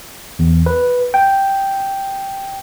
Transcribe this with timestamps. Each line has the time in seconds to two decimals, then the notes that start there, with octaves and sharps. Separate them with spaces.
0.39 E2
0.66 B4
1.14 G5